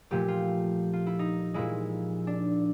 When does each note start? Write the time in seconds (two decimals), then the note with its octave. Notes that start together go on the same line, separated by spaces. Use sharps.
0.11 A#2 F3 A3 G4
0.28 F4
0.93 F4
1.06 E4
1.19 D#4
1.54 A#2 F3 G#3 E4
2.27 D4